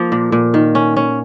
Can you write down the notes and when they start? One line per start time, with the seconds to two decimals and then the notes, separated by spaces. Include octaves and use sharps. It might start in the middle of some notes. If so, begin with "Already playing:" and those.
Already playing: F3 A#3
0.12 A#2
0.32 A#2
0.54 D#3
0.75 C#4
0.97 C#4